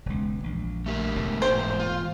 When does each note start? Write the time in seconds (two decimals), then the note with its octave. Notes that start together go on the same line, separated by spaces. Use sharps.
0.06 E1 C#2
0.44 A#1
0.86 A3 G4 A#4
1.16 E1 A2
1.42 G#2 A#3 C5 G5
1.79 F4